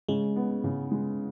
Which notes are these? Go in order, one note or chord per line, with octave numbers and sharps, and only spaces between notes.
C#3 G#3
B3
C#3
G#3